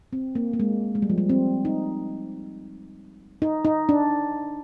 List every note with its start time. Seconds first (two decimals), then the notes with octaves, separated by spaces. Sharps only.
0.13 C4
0.35 A#3
0.53 A#3
0.60 G#3
0.95 G#3
1.02 G3
1.10 F3
1.18 G3
1.29 C4
1.65 D#4
3.42 D#4
3.65 D#4
3.89 D4